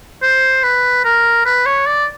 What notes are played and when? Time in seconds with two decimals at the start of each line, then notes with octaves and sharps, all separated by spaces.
0.22 C5
0.63 B4
1.04 A#4
1.46 B4
1.66 C#5
1.87 D5